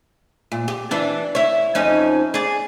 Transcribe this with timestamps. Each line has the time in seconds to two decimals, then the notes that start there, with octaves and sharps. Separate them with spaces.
0.52 A#2
0.68 G4
0.91 E3 D4
1.35 E4 C#5
1.75 F2 C#4 D#4
2.34 G#4 D5